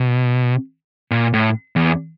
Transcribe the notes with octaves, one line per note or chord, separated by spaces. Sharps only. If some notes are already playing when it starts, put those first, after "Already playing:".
Already playing: B2
A#2
A2
E2